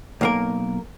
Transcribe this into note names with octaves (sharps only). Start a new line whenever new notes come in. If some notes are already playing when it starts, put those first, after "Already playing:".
B1 A#3 A#4